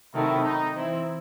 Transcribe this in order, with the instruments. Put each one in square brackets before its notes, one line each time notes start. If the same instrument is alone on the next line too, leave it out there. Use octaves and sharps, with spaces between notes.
[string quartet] C3 D#3 F#3 A3 [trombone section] E4
[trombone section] D#4
[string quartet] E3 C4 E4